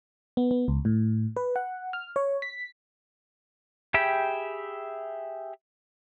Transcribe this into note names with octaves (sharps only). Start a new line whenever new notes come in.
B3
B3
C#2
A2
B4
F#5
F6
C#5
B6
G4 G#4 E5 G5 B5